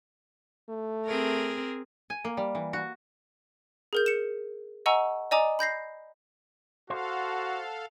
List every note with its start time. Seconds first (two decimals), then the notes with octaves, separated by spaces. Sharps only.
0.70 A3
1.06 C4 G#4 A#4
2.10 G#5
2.25 A#3
2.37 G3
2.55 E3
2.73 F#4
3.93 G#4 A#4 G6
4.06 C#7 E7
4.86 D#5 F#5 G#5 A#5 C#6 E6
5.31 D5 D#5 G#5 A#5 D6 D#6
5.59 B5 G6 A#6 C7
6.90 F#4 A4 C5 F5 F#5 A5